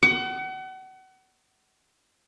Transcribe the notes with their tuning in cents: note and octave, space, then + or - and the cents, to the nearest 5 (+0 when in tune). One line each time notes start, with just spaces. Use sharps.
F#5 +35